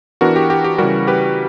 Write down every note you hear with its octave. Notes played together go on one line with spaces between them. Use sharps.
E3 B3 D4 F#4 A#4
G4
G4
G4
C#3 E3 G3 F#4 A#4
G4 B4